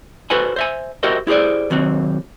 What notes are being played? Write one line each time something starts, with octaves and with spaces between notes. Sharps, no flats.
F#4 A4 B4 C5 F#5 G#5
C5 E5 G#5
F#4 G4 A#4 C5 D#5 E5
E4 G4 G#4 C5 D5
D#2 C3 D#3 F#3 C4